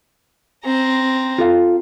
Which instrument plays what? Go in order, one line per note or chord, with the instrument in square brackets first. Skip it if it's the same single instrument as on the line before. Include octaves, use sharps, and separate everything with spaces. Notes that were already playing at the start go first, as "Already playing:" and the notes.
[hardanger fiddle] C4 A#5
[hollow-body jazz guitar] F4 A4 F5